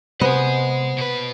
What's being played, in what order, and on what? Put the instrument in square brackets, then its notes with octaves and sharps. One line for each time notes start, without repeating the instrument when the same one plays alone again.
[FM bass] C3 [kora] B3 [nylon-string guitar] C5 [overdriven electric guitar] D#5 G#5
[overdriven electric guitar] B2 B4